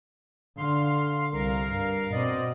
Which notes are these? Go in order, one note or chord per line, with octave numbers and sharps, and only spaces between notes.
D3 F5 C6
C2 A#4 F5
G2
B2 C4 D5 D#5